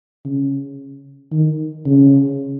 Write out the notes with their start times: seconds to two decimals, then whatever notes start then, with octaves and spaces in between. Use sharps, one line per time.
0.25 C#3
1.32 D#3
1.86 C#3